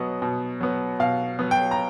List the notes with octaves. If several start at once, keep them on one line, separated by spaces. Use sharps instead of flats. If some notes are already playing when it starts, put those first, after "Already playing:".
Already playing: B2 F#3 B3 D#5
B2
F#3 B3
B2 F5
F#3 B3
G5
A#5